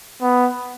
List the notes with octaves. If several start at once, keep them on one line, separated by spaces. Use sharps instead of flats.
B3